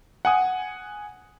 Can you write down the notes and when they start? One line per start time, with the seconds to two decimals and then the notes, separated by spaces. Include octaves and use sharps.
0.25 F#5 G#5 D#6